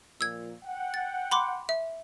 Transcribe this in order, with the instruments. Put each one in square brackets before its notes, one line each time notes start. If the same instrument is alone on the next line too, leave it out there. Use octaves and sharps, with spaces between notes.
[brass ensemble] A#2 F3 [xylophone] E6 G#6
[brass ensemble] F#5 G5
[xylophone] A6
B5 C6 D6
E5